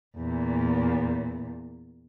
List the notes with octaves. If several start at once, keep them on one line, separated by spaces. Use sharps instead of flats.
E2 A#2